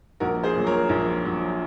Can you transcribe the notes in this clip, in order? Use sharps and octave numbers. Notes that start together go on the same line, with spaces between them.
A#1 F#4 A#4
G#4 C5
A#2 F#3
A#4 C#5
A#1
A#2 F#3